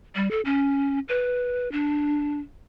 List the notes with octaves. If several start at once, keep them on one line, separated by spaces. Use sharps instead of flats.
G3
A4
C#4
B4
D4